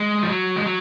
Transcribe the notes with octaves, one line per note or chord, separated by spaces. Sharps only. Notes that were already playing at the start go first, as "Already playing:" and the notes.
Already playing: G#3
F3
F#3
G#3
F#3